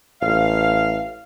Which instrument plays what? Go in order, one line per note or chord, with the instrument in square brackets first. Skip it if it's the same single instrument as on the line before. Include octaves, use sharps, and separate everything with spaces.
[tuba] A1 [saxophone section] F5